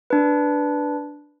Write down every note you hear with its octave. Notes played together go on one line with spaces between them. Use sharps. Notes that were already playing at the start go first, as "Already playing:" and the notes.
D4 B4